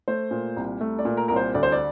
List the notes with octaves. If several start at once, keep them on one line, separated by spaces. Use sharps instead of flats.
A3 C5
A#2
C2
A3
D5
A#2
A#4
C2 A#4
C5
D2 D5
C5
D5